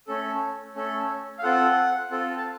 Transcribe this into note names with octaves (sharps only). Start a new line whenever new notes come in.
A3 C#4 A4
A3 C#4 A4
F5
C4 F4 A4 F#5
C4 F4 A4
A5